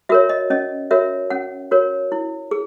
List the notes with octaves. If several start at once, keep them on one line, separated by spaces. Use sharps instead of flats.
F#4 A#4 C#5 E5
D#5
C#4 D#5
F#4 A#4 C#5 E5
C#4 F#5
F#4 A#4 C#5
E4
G#4